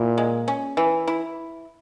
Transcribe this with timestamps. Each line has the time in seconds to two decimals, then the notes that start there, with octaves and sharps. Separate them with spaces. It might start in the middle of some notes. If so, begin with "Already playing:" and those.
Already playing: A#2 E4
0.18 G#3
0.48 C#4
0.77 E3
1.08 E4